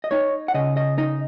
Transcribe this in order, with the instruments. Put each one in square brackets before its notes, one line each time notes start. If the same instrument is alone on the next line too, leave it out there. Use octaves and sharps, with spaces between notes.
[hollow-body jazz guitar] D#5
D#4 C#5
F#5
C#3 D#5
D#5
D#4 D#5